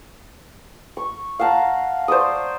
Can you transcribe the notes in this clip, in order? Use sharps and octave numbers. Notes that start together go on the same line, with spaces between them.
C#6
F5 F#5 A5 A#5
C5 D5 C#6 D#6